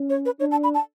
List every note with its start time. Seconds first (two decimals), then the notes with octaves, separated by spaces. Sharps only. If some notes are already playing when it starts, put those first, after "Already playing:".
Already playing: C#4
0.10 C#5
0.26 B4
0.40 D4 C#5
0.51 A5
0.64 B5
0.74 A5